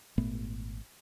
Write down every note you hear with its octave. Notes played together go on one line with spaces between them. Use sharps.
G#1 A#2 A3 B3